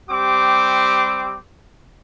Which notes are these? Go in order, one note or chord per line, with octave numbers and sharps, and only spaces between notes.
G3 C4 G4 D6